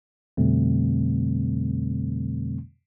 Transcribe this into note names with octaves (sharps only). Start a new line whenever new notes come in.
F2 B2 D3 G3 A3 C4